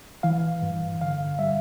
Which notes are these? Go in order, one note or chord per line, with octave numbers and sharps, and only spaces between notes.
E3 F5
G2
D3 F5
G3 E5